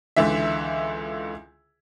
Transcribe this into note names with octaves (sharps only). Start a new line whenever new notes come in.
C#2 D3 E3 E5